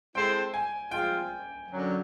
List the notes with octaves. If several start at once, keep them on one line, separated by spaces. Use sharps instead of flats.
G#3 C4 E4 A4 C5 G5
G#5
F3 G#3 C4 F4 G5
F#2 D3 F#3